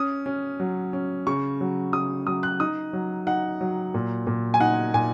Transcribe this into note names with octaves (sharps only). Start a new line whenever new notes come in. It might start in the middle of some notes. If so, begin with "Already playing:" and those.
Already playing: C#4 D#6
C#4
F#3
C#4
C#3 C#6
F#3
C#3 D#6
F#3 D#6
F#6
D#4 D#6
F#3
D#4 F#5
F#3
A#2
A#2
G#5
D#4 F#5
A#2 G#5